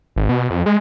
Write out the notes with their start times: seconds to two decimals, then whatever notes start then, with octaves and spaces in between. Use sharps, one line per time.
0.16 G#1
0.29 B2
0.50 F2
0.66 G#3